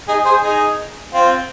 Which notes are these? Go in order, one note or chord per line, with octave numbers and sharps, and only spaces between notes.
D#4 G#4
G#4 C5
D#4 G#4
C4 F4